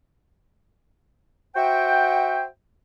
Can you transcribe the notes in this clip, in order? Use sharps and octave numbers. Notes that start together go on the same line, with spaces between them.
F#4 C5 E5 F#5 G5